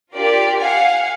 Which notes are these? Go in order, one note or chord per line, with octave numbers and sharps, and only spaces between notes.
D4 F4 G4 A#4 D5
F5 F#5 G#5